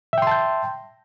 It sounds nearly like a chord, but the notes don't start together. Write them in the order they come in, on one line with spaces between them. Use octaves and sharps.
E5 G5 C6 A5 G6